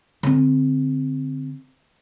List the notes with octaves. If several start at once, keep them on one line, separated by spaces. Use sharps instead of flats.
D3 C4